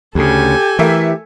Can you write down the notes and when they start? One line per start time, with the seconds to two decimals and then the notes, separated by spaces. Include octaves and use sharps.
0.15 D2 C#3 G4 A4 G#5
0.79 E3 A3 A#4 E5